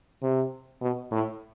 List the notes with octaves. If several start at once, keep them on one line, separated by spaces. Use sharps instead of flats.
C3
B2
A2